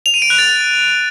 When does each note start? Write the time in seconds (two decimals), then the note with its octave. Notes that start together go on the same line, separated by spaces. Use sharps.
0.06 F7
0.14 D#7
0.22 D7
0.30 F#6
0.38 A6